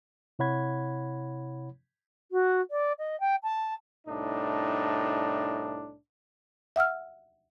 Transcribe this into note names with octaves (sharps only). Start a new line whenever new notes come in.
C3 E4 C#5 F#5 B5 G#6
F#4
D5
D#5
G5
A5
C2 A2 D4 D#4
E5 F#5 E6 F6